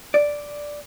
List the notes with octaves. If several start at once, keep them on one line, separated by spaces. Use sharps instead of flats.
D5